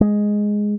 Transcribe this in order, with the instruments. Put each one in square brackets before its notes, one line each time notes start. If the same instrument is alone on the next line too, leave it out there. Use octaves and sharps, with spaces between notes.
[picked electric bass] G#3